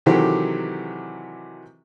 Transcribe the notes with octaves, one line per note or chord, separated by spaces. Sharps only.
C3 D#3 E3 F#3 G4 A4